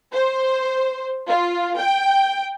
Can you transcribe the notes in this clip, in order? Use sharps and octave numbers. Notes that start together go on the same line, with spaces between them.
C5
F4
G5